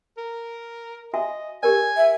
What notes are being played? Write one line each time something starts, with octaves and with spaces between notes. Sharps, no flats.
A#4
F#4 D#5 E5 G#5
G4 A#4 D5 G#5
E5